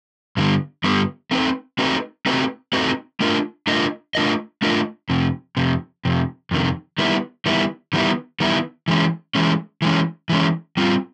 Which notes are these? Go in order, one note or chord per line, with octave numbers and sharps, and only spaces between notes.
G2 D3 G3 B3
G2 D3 G3 B3
A3 C4 D#4 F#4 B4
A3 C4 D#4 F#4 B4
A3 C4 D#4 F#4 B4
A3 C4 D#4 F#4 B4
A3 D4 F4 A#4 D#5
A3 D4 F4 A#4 D#5
A3 D4 F4 A#4 D#5
A3 D4 F4 A#4 D#5
F2 C3
F2 C3
F2 C3
F2 C3 D#3
D#3 G3 B3 E4
D#3 G3 B3 E4
D#3 G3 B3 E4
D#3 G3 B3 E4
E3 G#3 C#4
E3 G#3 C#4
E3 G#3 C#4
E3 G#3 C#4
G3 C4 F4